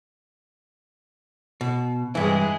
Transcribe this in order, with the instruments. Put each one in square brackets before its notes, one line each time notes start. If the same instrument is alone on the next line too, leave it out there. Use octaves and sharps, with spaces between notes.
[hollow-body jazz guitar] B2
[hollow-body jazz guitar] G2 E3 [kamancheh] G#3 E4